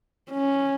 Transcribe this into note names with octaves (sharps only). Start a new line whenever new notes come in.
C#4